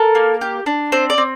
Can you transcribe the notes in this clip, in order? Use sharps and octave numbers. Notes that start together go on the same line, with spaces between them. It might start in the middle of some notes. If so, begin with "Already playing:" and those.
Already playing: A4 A#4
A#3
G4
D4
C4 C5
D5
C4